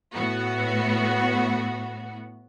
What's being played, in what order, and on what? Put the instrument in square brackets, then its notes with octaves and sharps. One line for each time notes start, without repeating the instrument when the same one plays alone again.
[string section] A2 B3 F#4